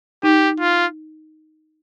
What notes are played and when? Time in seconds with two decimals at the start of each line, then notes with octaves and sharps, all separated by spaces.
0.23 D#4 G4
0.60 F4